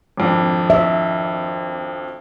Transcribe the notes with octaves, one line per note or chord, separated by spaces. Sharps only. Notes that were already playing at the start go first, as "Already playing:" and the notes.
G#1 F2 D4
E5